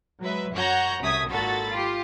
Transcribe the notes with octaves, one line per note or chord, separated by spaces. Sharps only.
F#3 G#3 B4 E5
F#2 F#4 C#5 F#5 A#5 G6
C2 F#2 A3 D#6 G#6 B6
G#1 A#2 F#4 A4 B5 A6
F4 G4